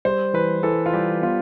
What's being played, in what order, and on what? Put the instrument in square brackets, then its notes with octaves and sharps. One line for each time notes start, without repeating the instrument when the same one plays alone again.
[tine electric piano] G3 [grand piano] C5
[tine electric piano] E3 [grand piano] B4
[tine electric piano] E3 [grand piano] A4
[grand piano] F4
[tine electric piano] G3 [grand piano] G4
[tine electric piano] B3 [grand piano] F4